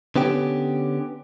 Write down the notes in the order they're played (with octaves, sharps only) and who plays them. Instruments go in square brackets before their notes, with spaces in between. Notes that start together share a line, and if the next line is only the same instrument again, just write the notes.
[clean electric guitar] D3 B3 C#4 G4